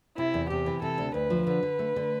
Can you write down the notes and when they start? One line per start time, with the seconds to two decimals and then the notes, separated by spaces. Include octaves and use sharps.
0.17 C3 E4
0.34 E2
0.50 C3 G4
0.66 E3
0.82 C3 A4
0.98 D2
1.14 D2 B4
1.30 F3
1.47 D3 B4
1.63 D3
1.79 A3
1.96 D3